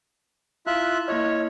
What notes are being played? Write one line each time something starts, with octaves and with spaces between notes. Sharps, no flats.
E4 F4 E5 F#6
A#3 E4 C#5 D#5